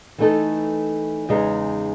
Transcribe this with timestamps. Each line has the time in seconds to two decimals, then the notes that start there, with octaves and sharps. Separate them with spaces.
0.18 E3 A3 D#4 A4
1.29 E2 C#3 G#3 D#4